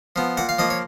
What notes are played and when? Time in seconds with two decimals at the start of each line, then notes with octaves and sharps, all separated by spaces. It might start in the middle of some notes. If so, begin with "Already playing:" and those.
0.16 F3 B3
0.37 A#2 F#5
0.49 F5
0.59 F3 A#3 D#5
0.70 C#5